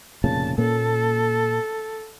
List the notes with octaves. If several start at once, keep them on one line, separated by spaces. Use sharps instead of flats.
F1 A#2 C#3 A5
A#2 A#3 C#4 A4